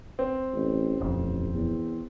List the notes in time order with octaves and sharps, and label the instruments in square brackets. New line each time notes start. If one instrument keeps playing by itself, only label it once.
[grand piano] C4
[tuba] A1
[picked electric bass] D#1 F2 [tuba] A1
[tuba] E2